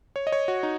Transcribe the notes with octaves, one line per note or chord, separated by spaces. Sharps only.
C#5
D#5
C#5
F#4
D#4